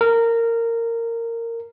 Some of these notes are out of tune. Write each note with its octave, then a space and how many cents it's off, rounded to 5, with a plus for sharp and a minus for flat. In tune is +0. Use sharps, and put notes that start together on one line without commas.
A#4 -15